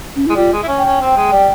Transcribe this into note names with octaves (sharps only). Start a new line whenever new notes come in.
C#4
G#3 E4
G3 F4
G#3
E4
C#4
G5
C#4
C4
G#3
G3